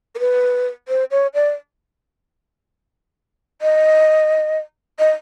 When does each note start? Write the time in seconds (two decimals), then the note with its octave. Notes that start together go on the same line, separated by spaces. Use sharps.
0.15 A#4
0.19 B4
0.88 C5
1.11 C#5
1.34 D5
3.62 D#5
4.99 D#5